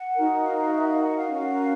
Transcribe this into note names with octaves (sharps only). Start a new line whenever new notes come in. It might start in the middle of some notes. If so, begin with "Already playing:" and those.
Already playing: F#5
D#4 F#4 A#4
F5
F5
E5
F5
F#5
F5
C#4 F#4 A#4